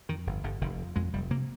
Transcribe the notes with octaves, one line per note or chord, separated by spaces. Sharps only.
F2 D#3
G1
G1 D3
F1 D#3
F2
F2 G#3
F1 G3
C3 A#3